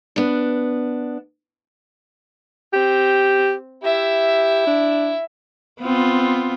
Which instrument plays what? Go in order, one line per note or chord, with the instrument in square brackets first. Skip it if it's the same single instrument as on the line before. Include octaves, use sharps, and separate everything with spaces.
[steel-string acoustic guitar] B3 D4
[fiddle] C4 [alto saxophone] G4
[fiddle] E4 E5 [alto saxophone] G4
[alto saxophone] D4
[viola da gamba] B3 C4 F4